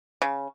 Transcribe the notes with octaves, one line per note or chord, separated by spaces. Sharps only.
C#3